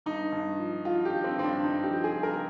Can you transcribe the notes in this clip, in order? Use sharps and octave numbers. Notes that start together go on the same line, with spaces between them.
G2 D#4
G2
F3
F3 F4
G4
G2
C4
G2 C4
D4
G2 D#4
G4
F3
G#4
G2
A#4